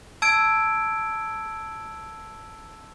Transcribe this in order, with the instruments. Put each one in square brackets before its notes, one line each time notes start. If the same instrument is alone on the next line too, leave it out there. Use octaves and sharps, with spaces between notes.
[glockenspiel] A5 E6 G#6 D7